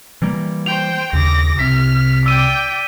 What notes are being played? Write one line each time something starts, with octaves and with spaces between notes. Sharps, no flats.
E3 G3 A#3
C5 G5 F7
D#2 C#3 D6 A#6
C2 C3 F6 B6
D5 G5 E6 D#7